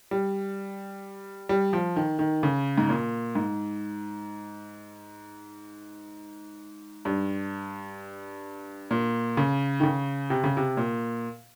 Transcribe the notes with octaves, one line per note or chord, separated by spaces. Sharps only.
G3
G3
F3
D#3
D#3
C#3
G#2
A#2
G#2
G2
A#2
C#3
D#3
C#3
C3
C#3
C3
A#2